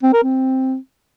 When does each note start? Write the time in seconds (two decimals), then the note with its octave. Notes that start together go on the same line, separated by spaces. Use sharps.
0.03 C4
0.13 A#4
0.23 C4